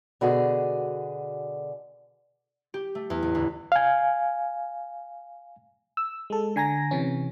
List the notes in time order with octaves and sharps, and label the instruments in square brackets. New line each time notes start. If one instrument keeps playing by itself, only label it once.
[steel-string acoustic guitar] B2 D3 F#4 G#4
[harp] G4
A3
E2
A1
D2
[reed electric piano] F5 G#5
[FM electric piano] E6
G#3 A4
D3 G#5 A#5 A#6
C3 E3 C#4